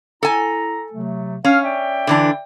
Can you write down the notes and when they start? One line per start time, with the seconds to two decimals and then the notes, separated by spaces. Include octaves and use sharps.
0.23 E4 A4 G#5 A#5
0.92 C3 F#3 A3
1.45 C#4 F5
1.63 D5 E5 G5
2.07 D3 E3 D4